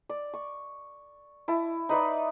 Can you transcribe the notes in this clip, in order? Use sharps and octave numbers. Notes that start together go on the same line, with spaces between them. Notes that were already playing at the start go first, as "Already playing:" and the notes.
D5
C#6
E4 A5
D#4 B4 D5 E5